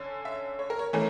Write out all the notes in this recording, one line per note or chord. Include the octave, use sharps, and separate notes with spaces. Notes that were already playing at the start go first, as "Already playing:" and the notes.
Already playing: D3 C#4
E5
C#5
A#4
C#5
A2 E3 A3 C#4 A#4